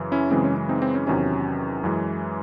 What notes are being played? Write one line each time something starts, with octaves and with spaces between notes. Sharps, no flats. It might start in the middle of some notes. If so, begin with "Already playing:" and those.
Already playing: F#2 C#3 E3
C#4 E4
F#2 C#3 E3 G#3 C4
C#4
C#4
C4 D#4
C4
C#4
E2 C3 D#3 F#3 C#4
F#2 E3 G#3